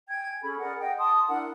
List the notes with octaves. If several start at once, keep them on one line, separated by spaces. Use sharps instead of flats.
G5 G#5 G#6
C#4 G#4 A4 B5
G#4 A#4 D5 F#5
G#4 D#5 F#5 G5
A5 C6 D#6
D4 E4 A#4 F#5